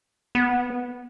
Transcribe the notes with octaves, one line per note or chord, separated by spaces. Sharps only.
B3